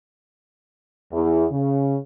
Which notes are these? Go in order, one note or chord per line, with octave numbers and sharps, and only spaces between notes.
E2
C#3